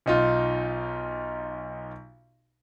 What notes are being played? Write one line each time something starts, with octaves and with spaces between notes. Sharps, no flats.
B1 D#4 F4